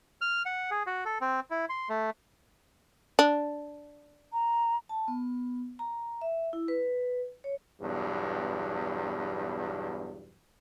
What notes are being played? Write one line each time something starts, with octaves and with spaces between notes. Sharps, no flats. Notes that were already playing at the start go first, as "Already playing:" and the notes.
F6
F#5
G#4
F#4
A4
C4
E4
C6
A3
D4
A#5
A5
B3
A#5
E5
E4
B4
C#5
B1 E2 G2